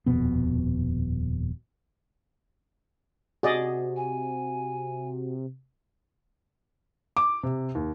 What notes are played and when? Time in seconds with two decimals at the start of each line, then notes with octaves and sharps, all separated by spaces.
0.06 D#1 F2 B2 B3
3.43 C3 F#4 G#4 D5 D#5
3.96 G#5
7.17 D6
7.43 C3
7.75 D#2